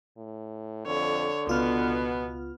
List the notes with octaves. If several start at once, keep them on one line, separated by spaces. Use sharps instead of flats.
A2
F2 D3 C#5
C#2 B2 B3 F4 F6